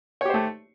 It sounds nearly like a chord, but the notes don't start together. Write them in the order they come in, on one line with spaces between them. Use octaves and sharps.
C#5 G4 C5 A3